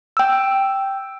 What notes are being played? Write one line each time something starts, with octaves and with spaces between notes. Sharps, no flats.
G5 E6